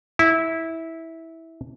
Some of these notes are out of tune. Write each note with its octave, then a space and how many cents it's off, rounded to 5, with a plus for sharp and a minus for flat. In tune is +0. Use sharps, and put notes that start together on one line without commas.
E4 -15